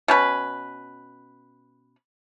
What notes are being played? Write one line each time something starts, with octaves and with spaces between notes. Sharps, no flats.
B2 C#4 B4